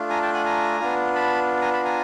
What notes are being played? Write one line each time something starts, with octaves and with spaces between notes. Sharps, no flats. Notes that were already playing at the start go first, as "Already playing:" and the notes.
Already playing: A3 D4 F4
G#5 A#5
G5 A5
F#5 G#5
G#5 A#5
B3 D4 F4
A5 B5
G#5 A#5
A5 B5
G#5 A#5